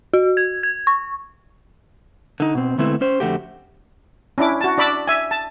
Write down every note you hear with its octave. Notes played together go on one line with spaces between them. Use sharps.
F#4
G#6
G#6
C#6
D3 D#4
B2 C4
D3 G#3 A3 B3 C4 E4
C#4 C5
F2 B2 D3 A3 F#4 G4
C#4 D4 E4 D6
F#4 A5
D4 D5 B5 D6 E6
E5 G#5
A5